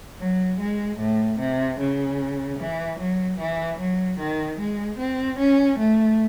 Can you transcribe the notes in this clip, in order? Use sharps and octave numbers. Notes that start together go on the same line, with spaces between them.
F#3
G#3
A2
C3
C#3
E3
F#3
E3
F#3
D#3
G#3
C4
C#4
A3